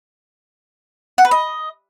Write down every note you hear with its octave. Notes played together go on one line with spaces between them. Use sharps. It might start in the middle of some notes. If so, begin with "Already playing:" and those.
F#5
B4
D#5